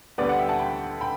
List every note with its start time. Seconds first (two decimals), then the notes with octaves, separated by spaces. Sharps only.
0.18 D2 D3 G3 B3 B4 D5
0.29 D5 F#5
0.39 E5 G5
0.49 F#5 A5
0.59 G5 B5
1.01 G5 B5